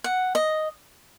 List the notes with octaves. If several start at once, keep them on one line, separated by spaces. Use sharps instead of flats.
F#5
D#5